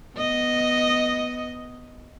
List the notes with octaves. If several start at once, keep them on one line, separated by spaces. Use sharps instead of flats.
B3 D#5